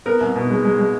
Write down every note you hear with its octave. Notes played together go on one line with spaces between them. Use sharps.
B3 A#4
C2
B2
G#3
G#3
G#3